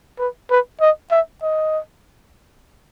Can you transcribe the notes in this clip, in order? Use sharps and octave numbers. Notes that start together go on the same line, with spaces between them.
B4
B4
D#5
E5
D#5